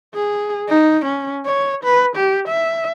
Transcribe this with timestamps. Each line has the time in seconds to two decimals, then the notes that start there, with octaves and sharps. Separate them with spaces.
0.15 G#4
0.68 D#4
1.05 C#4
1.46 C#5
1.84 B4
2.16 G4
2.48 E5